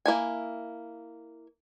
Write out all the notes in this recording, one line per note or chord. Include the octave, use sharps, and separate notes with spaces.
A#3 E4 G#5